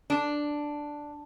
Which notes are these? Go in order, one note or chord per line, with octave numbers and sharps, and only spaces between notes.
D4